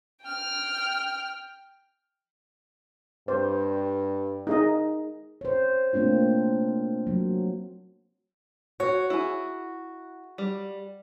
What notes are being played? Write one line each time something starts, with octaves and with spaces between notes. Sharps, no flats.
G5 F6
G2 C5
D#4 G#4 D#5
C5 C#5
A3 A#3 C4 D4 F4
F#3
F#4 C#5
E4 G#4
G3